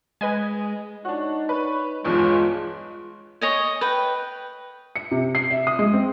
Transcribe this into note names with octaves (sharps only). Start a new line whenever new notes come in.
G#3 B4 D#5 G#5
D4 D#4 F#4 C#5
B4 C#5
B1 E2 G2 G#3 F4 C#5
C#5 D#5 G#5
B4 G5
C#7
C3
C7
E5
D#6
G#3
C4